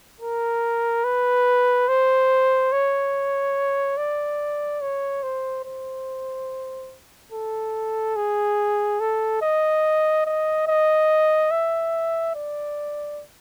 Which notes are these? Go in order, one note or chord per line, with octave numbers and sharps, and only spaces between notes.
A#4
B4
C5
C#5
D5
C#5
C5
C5
A4
G#4
A4
D#5
D#5
D#5
E5
D5